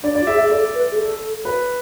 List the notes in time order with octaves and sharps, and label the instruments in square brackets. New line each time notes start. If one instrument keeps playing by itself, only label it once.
[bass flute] D4 [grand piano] D5
[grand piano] D5
[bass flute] F4
[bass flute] G#4 [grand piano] E5
[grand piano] E5
[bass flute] G#4
[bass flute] A4 [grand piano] D5
[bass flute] B4
G#4
A4
[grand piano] B4